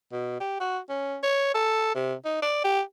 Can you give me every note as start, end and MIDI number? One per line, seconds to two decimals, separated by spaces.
0.12 0.36 47
0.40 0.57 67
0.60 0.78 66
0.89 1.17 61
1.23 1.49 73
1.55 1.91 69
1.95 2.14 48
2.25 2.39 63
2.42 2.61 74
2.64 2.81 67